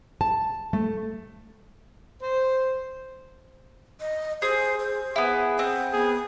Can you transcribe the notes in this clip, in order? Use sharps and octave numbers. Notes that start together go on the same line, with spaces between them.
A5
A3
C5
D#5
G#4 C5
C5
B3 E4 G#4
C4 F#5
B3 G#4